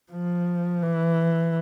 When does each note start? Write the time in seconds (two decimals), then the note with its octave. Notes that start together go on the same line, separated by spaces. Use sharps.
0.12 F3
0.82 E3